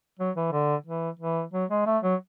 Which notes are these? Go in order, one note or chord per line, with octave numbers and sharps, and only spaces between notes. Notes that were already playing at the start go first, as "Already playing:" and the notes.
F#3
E3
D3
E3
E3
F#3
G#3
A3
F#3